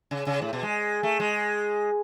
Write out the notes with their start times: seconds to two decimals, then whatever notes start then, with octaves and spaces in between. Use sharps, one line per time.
0.11 C#3
0.27 C#3
0.42 A2
0.53 B2
0.63 G#3
1.03 A3
1.20 G#3